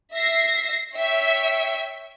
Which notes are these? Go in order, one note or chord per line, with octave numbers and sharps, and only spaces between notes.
E5 A#6 C7
C#5 E5 G5